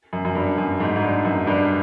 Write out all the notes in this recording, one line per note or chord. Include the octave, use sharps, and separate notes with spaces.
F#2
F#2
G2
F#2
G#2
G#2
G2
F#2
G2